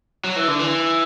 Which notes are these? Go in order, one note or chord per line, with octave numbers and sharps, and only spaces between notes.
F#3
E3
D3
E3